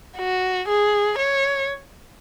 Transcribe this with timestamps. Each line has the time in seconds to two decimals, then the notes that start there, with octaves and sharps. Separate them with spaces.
0.18 F#4
0.68 G#4
1.18 C#5